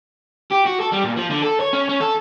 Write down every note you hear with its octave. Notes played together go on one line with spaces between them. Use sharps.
G4
F#4
A4
G3
A#2
F3
D3
A4
C#5
C#4
C#4
A4